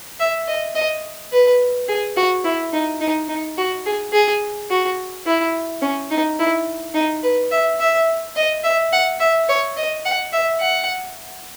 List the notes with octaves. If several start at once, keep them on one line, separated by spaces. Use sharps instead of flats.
E5
D#5
D#5
B4
G#4
F#4
E4
D#4
D#4
D#4
F#4
G#4
G#4
F#4
E4
C#4
D#4
E4
D#4
B4
E5
E5
D#5
E5
F#5
E5
C#5
D#5
F#5
E5
F#5